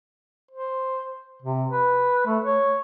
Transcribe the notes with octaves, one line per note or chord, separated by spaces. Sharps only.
C5
C3
B4
A3
C#5